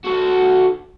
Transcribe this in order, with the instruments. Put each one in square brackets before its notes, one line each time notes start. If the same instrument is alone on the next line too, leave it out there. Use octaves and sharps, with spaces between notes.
[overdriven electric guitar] F#4 A4